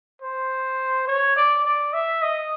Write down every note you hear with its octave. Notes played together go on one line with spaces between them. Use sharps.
C5
C#5
D5
D5
E5
D#5